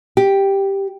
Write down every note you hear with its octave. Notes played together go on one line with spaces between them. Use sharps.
G4